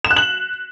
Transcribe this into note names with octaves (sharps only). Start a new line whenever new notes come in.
E7
F#6
F#7